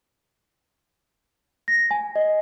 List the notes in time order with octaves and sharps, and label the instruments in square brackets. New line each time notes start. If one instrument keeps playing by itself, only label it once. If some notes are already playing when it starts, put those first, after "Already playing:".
[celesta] A#6
G#5
D#5